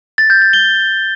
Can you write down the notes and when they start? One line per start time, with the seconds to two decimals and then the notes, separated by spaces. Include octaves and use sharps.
0.18 A6
0.30 G6
0.42 A6
0.53 G7